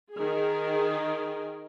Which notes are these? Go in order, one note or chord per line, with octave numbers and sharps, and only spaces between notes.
D#3 G#4